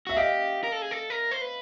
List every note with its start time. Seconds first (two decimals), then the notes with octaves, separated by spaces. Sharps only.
0.07 F#4 E5
0.16 G4 D#5 F5
0.64 A#4
0.72 A4
0.82 G#4
0.91 A4
1.10 A#4
1.31 C5
1.41 B4